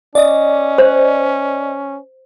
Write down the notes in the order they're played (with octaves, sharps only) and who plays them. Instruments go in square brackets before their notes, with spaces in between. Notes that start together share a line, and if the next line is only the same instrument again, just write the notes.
[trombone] C#4 [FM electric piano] D5 D#5
[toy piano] C5